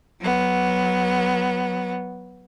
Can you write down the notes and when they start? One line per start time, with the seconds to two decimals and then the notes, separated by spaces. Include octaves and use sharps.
0.21 F#3 B3